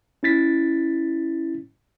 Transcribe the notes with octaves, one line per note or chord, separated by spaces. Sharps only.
C#4 E4 A6 B6